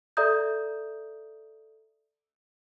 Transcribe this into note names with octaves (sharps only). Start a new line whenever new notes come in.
A4 D5 E5 A#5 D#6 G6